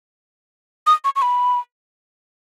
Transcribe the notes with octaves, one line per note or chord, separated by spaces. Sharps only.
D#6
C#6
C#6
B5